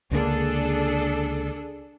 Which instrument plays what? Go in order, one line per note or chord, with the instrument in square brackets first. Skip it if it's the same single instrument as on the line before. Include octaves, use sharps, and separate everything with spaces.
[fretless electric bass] C#2 D3 A#3 [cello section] D4 G#4 A4